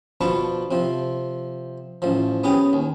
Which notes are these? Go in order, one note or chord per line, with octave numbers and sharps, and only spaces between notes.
B2 F3 D4 B4 C#6
C3 F3
A1 F3
B3 C#4 G4 G#4
D#2